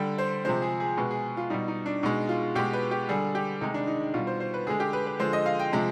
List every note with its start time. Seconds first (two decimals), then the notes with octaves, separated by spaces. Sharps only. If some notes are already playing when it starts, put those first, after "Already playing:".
Already playing: D3 G3 G5
0.18 C5
0.45 C3 F3 G#3 C5
0.62 G#4
0.80 G#4
0.97 B2 G#3 B4
1.11 G#4
1.37 F4
1.50 B2 G3 D#4
1.68 D#4
1.86 D4
2.03 B2 G#3 D#4
2.29 F4
2.55 B2 G#3 G4
2.73 B4
2.91 G4
3.09 D3 G3 G#4
3.35 G4
3.61 C3 D#3 G#3 D#4
3.74 D4
3.87 D#4
4.14 B2 G3 F4
4.27 C5
4.40 C5
4.54 B4
4.67 D3 G#3 G#4
4.80 G4
4.93 B4
5.06 B4
5.20 D3 F3 G#3 C5
5.33 D#5
5.46 F5
5.59 G5
5.73 C3 F3 G#3